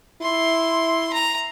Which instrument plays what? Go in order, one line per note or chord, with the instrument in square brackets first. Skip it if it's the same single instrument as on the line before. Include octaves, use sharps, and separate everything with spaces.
[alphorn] E4 [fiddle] C6
[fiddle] A#5